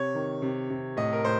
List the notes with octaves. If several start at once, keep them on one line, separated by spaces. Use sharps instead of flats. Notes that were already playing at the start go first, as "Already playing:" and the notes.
Already playing: C3 C#5
D#3
C3
C3
A2 D#5
A#4
A2 C5